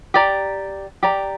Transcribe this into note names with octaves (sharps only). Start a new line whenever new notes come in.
G4 D5 A#5
G4 D5 A#5